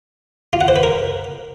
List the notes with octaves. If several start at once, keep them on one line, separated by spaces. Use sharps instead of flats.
F4
F#5
C5
B4
A#4